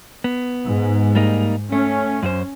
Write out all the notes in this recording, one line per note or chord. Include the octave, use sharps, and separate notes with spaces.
B3
G#2
G3 A#3 D#4
A3 C#4
F#2 F#4 C5